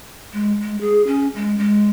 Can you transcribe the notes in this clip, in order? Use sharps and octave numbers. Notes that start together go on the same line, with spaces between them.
G#3
G#3
G#4
C#4
G#3
G#3